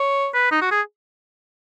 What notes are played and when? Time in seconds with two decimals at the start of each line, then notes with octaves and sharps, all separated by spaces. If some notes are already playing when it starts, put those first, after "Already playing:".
Already playing: C#5
0.34 B4
0.52 D#4
0.61 F#4
0.71 G#4